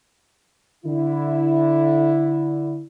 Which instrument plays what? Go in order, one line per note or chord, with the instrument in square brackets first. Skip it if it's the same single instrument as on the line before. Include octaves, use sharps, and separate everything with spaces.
[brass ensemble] D3 E4